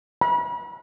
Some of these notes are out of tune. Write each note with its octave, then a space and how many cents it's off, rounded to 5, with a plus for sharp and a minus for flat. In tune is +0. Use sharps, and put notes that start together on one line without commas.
B5 -35